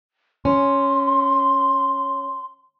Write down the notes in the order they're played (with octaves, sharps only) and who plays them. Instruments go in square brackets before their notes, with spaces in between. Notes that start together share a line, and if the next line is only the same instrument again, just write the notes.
[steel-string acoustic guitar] C#4 [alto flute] C6